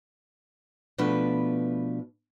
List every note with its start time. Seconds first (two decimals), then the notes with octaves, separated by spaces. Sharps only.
0.98 B2 F3 A3 D4 B4